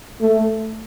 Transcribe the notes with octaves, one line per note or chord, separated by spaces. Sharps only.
A3